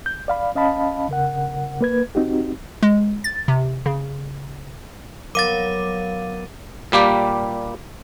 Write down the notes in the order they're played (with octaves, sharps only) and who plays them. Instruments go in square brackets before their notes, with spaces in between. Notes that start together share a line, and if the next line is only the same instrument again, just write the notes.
[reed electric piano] G6
D5 F5 B5
C#4 D#5 F5 A5 B5
C#3 A#4 F#5
A#3 B4 G#6
C4 D#4 F#4 G4
[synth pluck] G#3
A6
C3
C#3
[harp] F#3 B3 [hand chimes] A#4 [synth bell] F5 D6 [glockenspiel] A6 D#7
[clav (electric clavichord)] A#2 G3 A#3 G4